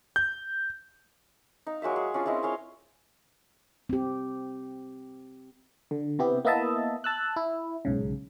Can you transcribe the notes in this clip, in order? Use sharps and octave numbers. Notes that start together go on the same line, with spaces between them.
G6
D#4 F5
F#3 G#3 A#3 E5
G#4
C#4 D4 F4
G#3 C4 E4 D#5
G#4 C#5 F5 C6
C4 G4
D3
C3 B3 E4 G4
A#3 B3 E4 D#5 E5 A5
A5 E6 F#6
E4
B1 G#2 C#3